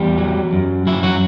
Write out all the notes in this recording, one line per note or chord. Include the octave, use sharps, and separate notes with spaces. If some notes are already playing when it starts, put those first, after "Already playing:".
Already playing: E2 G3 G4
F#3
F#2
F#3 E4
F#3 F#4